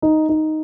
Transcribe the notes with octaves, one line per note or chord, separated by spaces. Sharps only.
D#4
D#4